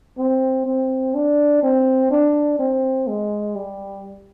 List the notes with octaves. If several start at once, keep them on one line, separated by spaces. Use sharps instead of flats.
C4
C4
D4
C4
D4
C4
G#3
G3